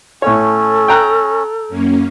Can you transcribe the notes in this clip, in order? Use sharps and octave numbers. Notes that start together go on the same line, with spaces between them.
A2 C#4 A4 C#5
G5 A#5 F#6
F#2 A#3 C#4